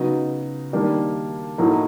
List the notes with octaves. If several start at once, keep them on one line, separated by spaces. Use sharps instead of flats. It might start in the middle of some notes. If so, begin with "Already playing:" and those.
Already playing: C#3 F#3 B3 D#4 F#4
D#3 G3 A#3 D4 G4
A2 F#3 A#3 D#4